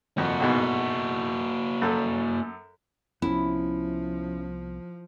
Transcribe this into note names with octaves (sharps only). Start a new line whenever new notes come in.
F2 A#3 F#4
B1 G#2 B2
F#2 A4
C2 F3 B3 C#4 E4